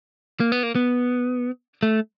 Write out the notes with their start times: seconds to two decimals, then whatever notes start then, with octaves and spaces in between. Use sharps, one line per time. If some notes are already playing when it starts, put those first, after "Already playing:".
0.40 A#3
0.52 B3
0.63 A#3
0.75 B3
1.83 A3